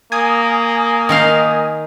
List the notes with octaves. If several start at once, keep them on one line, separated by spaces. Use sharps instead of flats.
A#3 G#5 D#6
D#3 D#4 F5